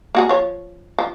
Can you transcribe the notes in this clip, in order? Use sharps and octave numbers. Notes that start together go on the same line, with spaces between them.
A#3 F#4 G#4
F3 C#5
F3